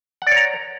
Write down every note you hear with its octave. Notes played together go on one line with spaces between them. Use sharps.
C#5 D5 F#5 A#5